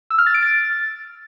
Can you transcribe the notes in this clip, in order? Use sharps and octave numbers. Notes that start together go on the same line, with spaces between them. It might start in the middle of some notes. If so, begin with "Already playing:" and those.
E6
F6
A6
D7
A6